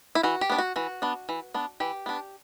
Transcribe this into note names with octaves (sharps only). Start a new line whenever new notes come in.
E4
E3 F#4
G4
B3 D4
F#4
E3 F#4
B3 D4
E3
B3 D4
E3 G4
B3 D4